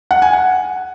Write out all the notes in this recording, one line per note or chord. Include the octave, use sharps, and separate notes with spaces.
F#5
G#5
F#5